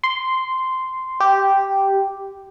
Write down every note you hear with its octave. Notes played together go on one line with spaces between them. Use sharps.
C6
G4